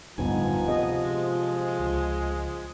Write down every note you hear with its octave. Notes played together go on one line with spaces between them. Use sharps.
D1 D2 G2 F3 B3 D#4 G#5
C3 D#5
G#3
C#2